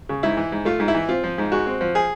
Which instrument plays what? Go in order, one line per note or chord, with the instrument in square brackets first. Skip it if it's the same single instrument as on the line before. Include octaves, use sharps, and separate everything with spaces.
[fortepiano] C#3
G#2 E4
E3
G#2
A3 F4
G#2
E4
E3
C4 F4
F3
G#2
G#3 F#4
C4
F3
G#4